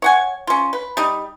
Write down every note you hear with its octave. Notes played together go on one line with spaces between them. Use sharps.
C#5 F#5 G#5
C#4 F4
B4
G3 D#4